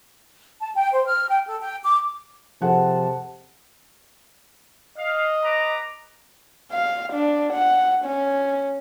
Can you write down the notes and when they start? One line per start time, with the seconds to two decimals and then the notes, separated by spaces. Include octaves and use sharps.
0.60 A5
0.74 G5
0.91 C5
1.06 F6
1.28 G5
1.47 A4
1.60 G5
1.84 D6
2.62 C3 F3 G#4 A4 F#5 A5
4.98 D#5 F5
5.44 B4 A#5 D6
6.73 F5
7.13 D4
7.53 F#5
8.05 C#4